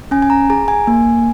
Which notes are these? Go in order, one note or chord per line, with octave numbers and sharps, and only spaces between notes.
C#4 G#5
G#5
A#5
G#4 A#5
G#5
A#3